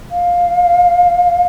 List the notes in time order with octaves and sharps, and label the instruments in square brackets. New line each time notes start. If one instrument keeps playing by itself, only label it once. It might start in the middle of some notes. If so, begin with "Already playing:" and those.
[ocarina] F5